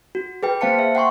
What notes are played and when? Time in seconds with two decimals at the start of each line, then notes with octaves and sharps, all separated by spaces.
0.15 F#4
0.43 G#4 B4 G5
0.61 A#3 C5 F5 A5 C#7
0.79 E5
0.95 F#5 G5 C6 C#6